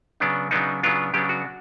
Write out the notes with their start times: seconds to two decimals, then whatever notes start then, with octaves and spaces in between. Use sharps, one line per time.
0.20 C#3 F#3 B3 D4
0.51 C#3 F#3 B3 D4 D#4
0.83 C#3 F#3 B3 D4 F4
1.14 C#3 F#3 B3 D4 G4
1.29 F#4